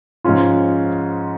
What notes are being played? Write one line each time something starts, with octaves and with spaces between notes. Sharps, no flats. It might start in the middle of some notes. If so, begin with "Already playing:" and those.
G#2 F3 G#3 C#4 F4